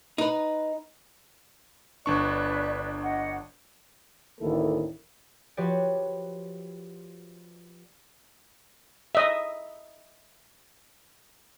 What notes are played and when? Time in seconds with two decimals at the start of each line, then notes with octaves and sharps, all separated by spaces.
0.18 D#4 B4
2.06 G1 D4 B4 D5 C#6 F#6
3.03 D#5 F#5
4.41 A1 D2 D#3 A#3 E4 A4
5.57 F3 F#4 G4 B4 C#5 D5
9.15 D#5 E5